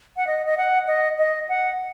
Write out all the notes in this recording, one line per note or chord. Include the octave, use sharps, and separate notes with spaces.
F#5
D#5
D#5
F#5
D#5
D#5
F#5